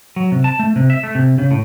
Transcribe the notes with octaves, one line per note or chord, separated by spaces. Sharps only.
F#3
C3
A5
A3
C3
E5
A3
C3
C#3
A2